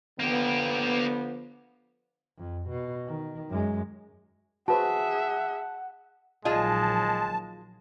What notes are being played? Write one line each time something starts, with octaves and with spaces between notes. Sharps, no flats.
D3 F3 A#3 B3 G4
F2
B2
D#3
F#2 G#3
F#4 G#4 B4 C5 E5 F#5 A5
A#1 D#3 F#3 G#3 F4 G#4 D#5 A5